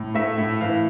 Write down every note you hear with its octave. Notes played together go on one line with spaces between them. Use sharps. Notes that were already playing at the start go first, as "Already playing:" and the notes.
Already playing: A2
A3 E5
A2
E3 F5